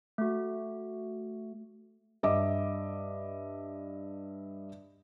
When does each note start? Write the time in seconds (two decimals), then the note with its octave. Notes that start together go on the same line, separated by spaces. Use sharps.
0.18 A3 F#4
2.23 G2 D#5 E5 D6